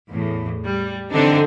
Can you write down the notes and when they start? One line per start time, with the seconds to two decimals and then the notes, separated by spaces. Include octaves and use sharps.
0.10 E2 A2
0.65 G3
1.11 D3 E3 C4 D4 D#4